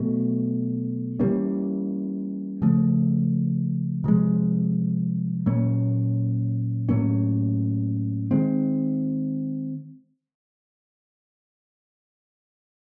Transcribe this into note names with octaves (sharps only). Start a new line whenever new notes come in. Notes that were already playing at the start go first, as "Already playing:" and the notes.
Already playing: B2 F#3 A3
E3 G3 A#3 C#4
C#3 F3 A3
C3 F3 G#3
A#2 F#3 A#3 C#4
A2 F#3 A#3 C#4
D#3 G#3 C4